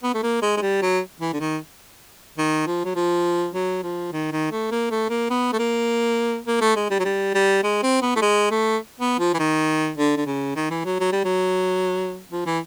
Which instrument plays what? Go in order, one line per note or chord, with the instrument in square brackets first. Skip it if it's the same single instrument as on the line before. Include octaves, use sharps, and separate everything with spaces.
[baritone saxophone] B3
A3
A#3
G#3
G#3
G3
F#3
E3
D3
D#3
D#3
F3
F#3
F3
F#3
F3
D#3
D#3
A3
A#3
A3
A#3
B3
A3
A#3
A#3
A3
G#3
G3
F#3
G3
G3
G#3
C4
B3
A3
G#3
A3
B3
F3
E3
D#3
D3
D3
C#3
D#3
E3
F#3
F#3
G3
F#3
F3
E3